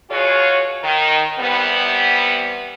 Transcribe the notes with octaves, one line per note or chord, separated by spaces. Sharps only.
B2 F4 F#4 G#4 C#5
D#3
C3 E3 G3 B3